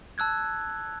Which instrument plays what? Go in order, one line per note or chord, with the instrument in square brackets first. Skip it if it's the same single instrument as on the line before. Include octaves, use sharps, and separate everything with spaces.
[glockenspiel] A5 E6 F#6 G#6